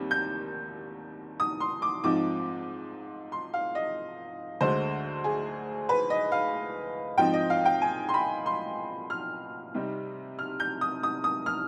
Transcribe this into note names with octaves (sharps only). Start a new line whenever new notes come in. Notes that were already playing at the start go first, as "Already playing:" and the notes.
Already playing: D#2 D#3 G3 C4
G6
D#6
C6
D6
G#2 F3 C4 D#4 D6
C6
F5
D#5
D2 D3 G#3 C5
G#4
B4
D#5
F5
G#2 F3 C4 D#4 G5
D#5
F5
G5
G#5
C6
B5
C6
F6
C3 G3 C4 D#4
F6
G6
D#6
D#6
D#6
F6